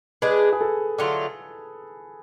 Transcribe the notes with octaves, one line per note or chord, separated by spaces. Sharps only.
G#3 D4 G#4 B4
G#4
A4
D3 F#3 A3 F4